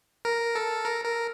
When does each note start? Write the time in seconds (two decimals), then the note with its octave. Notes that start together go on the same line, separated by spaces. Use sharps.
0.25 A#4
0.55 A4
0.85 A#4
1.05 A#4